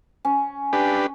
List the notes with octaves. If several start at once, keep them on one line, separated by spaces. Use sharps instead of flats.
C#4
D4 G4 B4